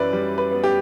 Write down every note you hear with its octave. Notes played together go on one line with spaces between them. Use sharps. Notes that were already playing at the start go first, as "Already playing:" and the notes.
Already playing: F#2 E3 B4 D5 E5
G3
B4
B3
G4